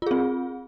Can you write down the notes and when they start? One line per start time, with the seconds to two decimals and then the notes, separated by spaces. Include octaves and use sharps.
0.02 F4
0.06 G#4
0.11 C4